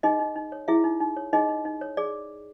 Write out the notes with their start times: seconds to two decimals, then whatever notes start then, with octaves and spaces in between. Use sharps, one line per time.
0.03 D#4 G#4 D#5
0.19 D#4
0.36 D#4
0.52 C#5
0.68 E4 G#4 E5
0.84 D#4
1.00 D#4
1.17 C#5
1.33 D#4 G#4 D#5
1.49 D#4
1.65 D#4
1.81 C#5
1.97 G#4 D5